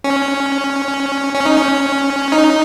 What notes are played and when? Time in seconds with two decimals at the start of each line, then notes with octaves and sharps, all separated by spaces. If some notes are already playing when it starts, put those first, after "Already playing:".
0.04 C#4
1.34 C#4
1.45 D#4
1.56 C#4
2.32 D#4